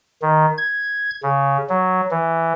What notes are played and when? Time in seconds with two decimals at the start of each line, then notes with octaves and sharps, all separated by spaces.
0.22 D#3
0.58 G#6
1.23 C#3
1.69 F#3
2.11 E3